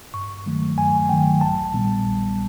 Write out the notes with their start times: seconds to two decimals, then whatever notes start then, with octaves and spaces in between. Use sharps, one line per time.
0.14 G2 C#6
0.46 D#3 F#3 A3
0.78 G2 G#5
1.09 D#3 F#3 A3 G5
1.41 A#1 A5
1.74 A#2 G3 B3
2.05 A#1